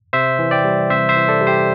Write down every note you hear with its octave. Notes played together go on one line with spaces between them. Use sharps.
C3 C5 E5
E3
D5 G5
G3
C3 C5 E5
C5 E5
E3
A4 D5
G3
G4 C5